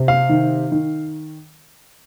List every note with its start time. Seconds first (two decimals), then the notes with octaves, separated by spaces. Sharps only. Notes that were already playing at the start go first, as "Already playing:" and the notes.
Already playing: C3
0.08 F5
0.29 D#3
0.72 D#3